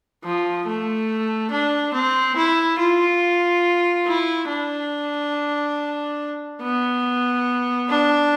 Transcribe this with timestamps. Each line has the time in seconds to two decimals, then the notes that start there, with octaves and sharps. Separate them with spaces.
0.24 F3
0.66 A3
1.51 D4
1.94 C4
2.36 E4
2.79 F4
4.07 E4
4.48 D4
6.62 B3
7.89 D4